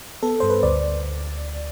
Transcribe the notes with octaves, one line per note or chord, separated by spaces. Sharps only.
B3 A4
G2 C5
B4
D2 D5